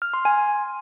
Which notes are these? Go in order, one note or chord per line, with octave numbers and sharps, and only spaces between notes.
F6
C6
G#5